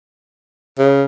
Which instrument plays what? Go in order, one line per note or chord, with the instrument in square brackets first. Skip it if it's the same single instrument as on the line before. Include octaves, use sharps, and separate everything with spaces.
[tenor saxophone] C#3